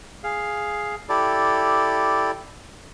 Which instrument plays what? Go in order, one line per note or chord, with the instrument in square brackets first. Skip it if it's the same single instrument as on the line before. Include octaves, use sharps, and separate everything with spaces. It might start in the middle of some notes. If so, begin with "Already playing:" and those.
[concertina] G#4 F5
E4 G4 A4 D5